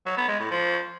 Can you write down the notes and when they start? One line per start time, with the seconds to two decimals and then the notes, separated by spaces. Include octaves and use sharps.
0.06 F#3
0.17 B3
0.29 G#3
0.40 A2
0.51 F3